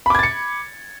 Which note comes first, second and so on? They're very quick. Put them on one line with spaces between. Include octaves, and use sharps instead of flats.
B5 D6 G#6 A6 C#7